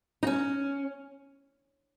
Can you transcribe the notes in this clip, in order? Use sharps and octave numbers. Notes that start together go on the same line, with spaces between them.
D#4
C#4